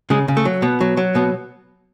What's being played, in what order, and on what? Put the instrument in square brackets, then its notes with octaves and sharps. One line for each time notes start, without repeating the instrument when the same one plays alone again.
[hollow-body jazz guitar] C#3 G#3
C#3
A3
F#3
B2 B3
F#3
F#3
B2 B3